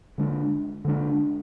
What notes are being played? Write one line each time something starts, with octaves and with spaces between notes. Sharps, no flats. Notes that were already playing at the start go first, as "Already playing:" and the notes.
D3 G#3 D4
D3 G#3 D4